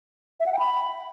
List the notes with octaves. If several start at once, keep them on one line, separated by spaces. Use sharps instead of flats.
E5
F#5
G5
B5